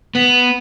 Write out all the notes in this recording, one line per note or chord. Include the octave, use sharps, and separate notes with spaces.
B3